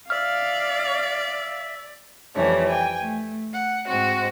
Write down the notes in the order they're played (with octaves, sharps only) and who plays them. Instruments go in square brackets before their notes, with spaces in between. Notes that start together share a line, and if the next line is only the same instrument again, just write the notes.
[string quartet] D5 [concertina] E5 [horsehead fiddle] F5 [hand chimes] F6
[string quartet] F2 E3 G3 A3 C#5
G5 G#5
A3
F#5
G#2 C4 F#4